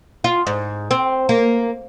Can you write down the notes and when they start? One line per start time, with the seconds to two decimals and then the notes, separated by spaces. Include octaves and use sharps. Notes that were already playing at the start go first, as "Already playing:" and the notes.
0.24 F4
0.47 G#2
0.91 C4
1.29 A#3